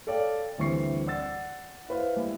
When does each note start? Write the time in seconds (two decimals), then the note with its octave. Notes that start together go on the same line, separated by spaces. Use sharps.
0.07 A4 C#5 D5 F5 G5
0.58 D2 E3 G3 C4 C#6 C7
1.07 D5 F#5 E6 A6
1.89 E4 B4 C5 F5
2.16 G3 G#3 A#3 E4